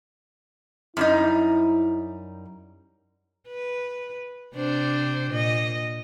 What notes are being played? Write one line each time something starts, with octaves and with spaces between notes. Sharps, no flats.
F#2 G3 D#4 E4
B4
C3 D4 C5
A#2 D#5